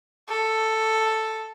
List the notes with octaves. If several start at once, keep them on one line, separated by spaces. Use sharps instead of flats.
A4